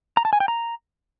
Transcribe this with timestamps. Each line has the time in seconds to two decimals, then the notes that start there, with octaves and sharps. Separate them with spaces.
0.17 A#5
0.25 A5
0.33 G#5
0.40 G5
0.48 A#5